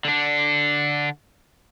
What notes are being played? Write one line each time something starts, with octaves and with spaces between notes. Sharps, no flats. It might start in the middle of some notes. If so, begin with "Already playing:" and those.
D3 D4